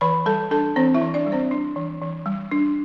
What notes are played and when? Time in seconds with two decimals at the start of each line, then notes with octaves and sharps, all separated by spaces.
0.01 E3 B4 B5
0.26 G3 A4 A5
0.51 D4 A4 A5
0.76 E3 C4 C5
0.94 E4 E5
1.02 E3
1.14 D4 D5
1.26 G3
1.32 C4 C5
1.51 D4
1.76 E3
2.01 E3
2.26 G3
2.51 D4